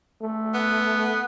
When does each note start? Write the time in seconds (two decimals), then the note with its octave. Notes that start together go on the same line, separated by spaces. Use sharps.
0.22 A3
0.54 B3